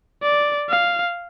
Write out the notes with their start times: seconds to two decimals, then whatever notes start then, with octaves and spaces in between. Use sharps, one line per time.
0.23 D5
0.70 F5